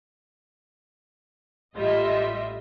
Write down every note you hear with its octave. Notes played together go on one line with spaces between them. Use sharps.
A1 G3 F4 D#5 E5